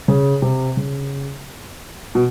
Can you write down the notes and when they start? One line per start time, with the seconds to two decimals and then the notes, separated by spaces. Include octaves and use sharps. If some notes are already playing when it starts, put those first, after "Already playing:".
0.08 C#3
0.42 C3
0.77 C#3
2.15 B2